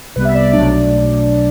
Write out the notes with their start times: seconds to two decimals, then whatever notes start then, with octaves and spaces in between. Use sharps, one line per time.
0.16 C2 C3 G3 B3 B4
0.25 E5
0.35 D5
0.53 B1 B2 F#3 A3 D4 D5